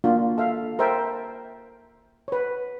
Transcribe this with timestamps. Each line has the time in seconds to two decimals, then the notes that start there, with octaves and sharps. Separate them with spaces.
0.04 A#3 D4 F4 F#4
0.38 A4 E5 F5
0.79 A#4 C5 E5 G5 A5
2.28 B4 C#5